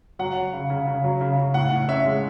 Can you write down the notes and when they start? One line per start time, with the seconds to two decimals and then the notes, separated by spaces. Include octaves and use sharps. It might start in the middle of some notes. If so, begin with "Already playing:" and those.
0.19 F#3 F#5
0.37 F#3
0.53 C#3
0.70 C#3
0.87 C#3
1.04 F#3
1.21 C#3
1.38 C#3
1.54 A2 F#5
1.72 A2
1.88 C#4 E5
2.06 G#3